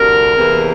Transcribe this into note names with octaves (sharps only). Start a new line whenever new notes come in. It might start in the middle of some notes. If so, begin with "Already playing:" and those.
Already playing: D2 C3 G3 A#4
E2 C3 E3 A#3